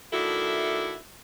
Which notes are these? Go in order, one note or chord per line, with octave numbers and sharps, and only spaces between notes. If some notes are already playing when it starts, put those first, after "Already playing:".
D#3 A3 D4 E4 F#4 A4